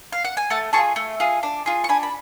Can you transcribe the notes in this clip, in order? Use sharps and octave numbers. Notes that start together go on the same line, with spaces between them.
F5
F#5
G#5
A3 F#5 A5
F4 G#4 A5 C#6
A3
F4 G#4
D4
F4 G#4
C#6
D4 G#5 B5
B5